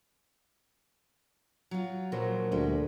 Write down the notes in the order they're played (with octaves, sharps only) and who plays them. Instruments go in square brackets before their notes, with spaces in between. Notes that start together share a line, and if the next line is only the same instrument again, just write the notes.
[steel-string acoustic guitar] F#3 F4
[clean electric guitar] A#2 A#4 C5 [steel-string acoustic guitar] F#3
[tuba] D2 [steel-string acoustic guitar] G3 G#3